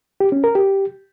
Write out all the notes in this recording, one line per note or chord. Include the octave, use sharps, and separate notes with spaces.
G4
C#4
A#4
G4